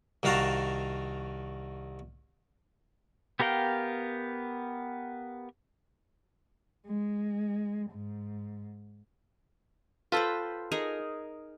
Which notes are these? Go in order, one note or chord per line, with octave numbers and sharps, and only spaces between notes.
C2 D#3 F#4 F5 A5 A#5
B3 G4 A#4 F5 G5
G#3
G#2
F4 A4 B4 C5 G5
D#4 G#4 A#4